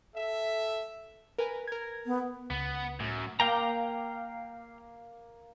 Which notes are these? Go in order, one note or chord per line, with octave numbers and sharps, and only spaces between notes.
A4 E5
A#4 B4 G#5
A#4 G#6
B3
C#2 B3
F#2 A2
A#3 F5 G5 A#5